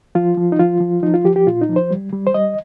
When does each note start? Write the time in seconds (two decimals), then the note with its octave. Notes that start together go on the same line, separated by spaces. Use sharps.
0.15 F3 F4
0.37 F3
0.52 D#4
0.59 F3 F4
0.81 F3
1.03 F3 D#4
1.14 F4
1.24 F3 G4
1.36 G4
1.47 A#2 F4
1.62 D#4
1.69 F3
1.76 C5
1.91 G3
2.12 G3
2.27 C5
2.34 G3 D#5